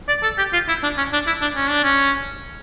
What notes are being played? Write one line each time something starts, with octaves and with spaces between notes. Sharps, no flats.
D5
A4
G4
F4
E4
D4
C#4
D4
E4
D4
C#4
D4
C#4